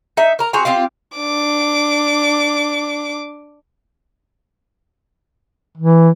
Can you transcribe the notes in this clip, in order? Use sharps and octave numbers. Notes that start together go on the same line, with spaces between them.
D#4 E5
A#4 A#5
C4 F#4 G#4 A#5
C4 F4 G4 F5
D4 D6
E3